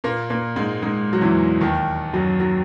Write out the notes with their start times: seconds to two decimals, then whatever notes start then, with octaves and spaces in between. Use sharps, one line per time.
0.04 A#2 A#3
0.30 A#2 A#3
0.56 G#2 G#3
0.83 G#2 G#3
1.13 F#3
1.21 E2 E3
1.61 D#2 D#3
2.13 F#2 F#3
2.40 F#3